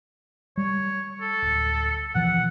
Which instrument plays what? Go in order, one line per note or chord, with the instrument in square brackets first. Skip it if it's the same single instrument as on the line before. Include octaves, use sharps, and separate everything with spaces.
[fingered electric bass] G3 [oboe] C#5
[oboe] A4
[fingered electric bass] D1
[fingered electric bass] B2 E3 F3 [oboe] F#5